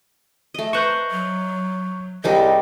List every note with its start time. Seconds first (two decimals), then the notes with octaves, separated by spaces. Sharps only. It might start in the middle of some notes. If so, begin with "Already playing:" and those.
0.54 A3 D#5
0.73 B4 C5 A#5 C#6 F#6 G6
1.11 F#3
2.24 C2 G3 G#3 D#4 D#5